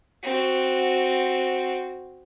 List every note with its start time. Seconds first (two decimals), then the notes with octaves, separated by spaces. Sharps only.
0.23 C4 F#4